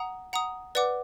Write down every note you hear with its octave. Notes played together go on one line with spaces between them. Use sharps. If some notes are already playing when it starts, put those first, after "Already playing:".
Already playing: F#5 A#5 D#6
F#5 A#5 D#6
B4 D5 F#5 D6